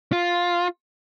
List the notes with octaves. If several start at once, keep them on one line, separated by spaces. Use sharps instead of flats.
F4